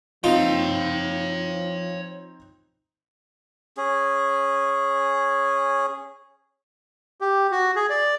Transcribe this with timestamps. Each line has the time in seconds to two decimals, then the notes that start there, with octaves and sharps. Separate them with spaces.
0.24 F3 C4 D#4 F4 C#5 G5
3.77 C#4 G#4
7.21 G4
7.51 F#4
7.76 G#4
7.90 D5